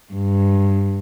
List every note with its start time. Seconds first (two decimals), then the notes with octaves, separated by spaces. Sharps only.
0.13 G2